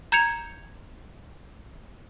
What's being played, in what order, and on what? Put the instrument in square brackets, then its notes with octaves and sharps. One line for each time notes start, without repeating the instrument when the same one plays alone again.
[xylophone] A#5 G6 G#6 C#7 F7